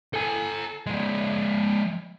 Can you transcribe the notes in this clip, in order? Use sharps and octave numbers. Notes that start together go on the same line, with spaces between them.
A4 G#5
F3 G#3